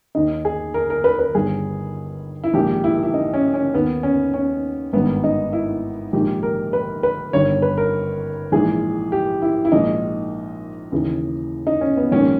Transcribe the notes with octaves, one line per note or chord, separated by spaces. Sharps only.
D#2 D#3 D#4
G#4
A#4
A#4
B4
B4
G1 G2 D#3 G#4
E4
A#1 G#2 D#3 G4
E4
E4
D#4
C#4
C#4
D#2 D#3 B3
C#4
C#4
G#1 G2 D#3 B3
D#4
E4
A#1 G#2 D#3 G4
A#4
B4
B4
G1 G2 D#3 C#5
B4
A#4
A#1 G#2 E3 G#4
G4
E4
E4
A#1 G#2 D#3 D#4
D#2 C#3 E3
D#4
C#4
B3
A#1 G#2 D#3 C#4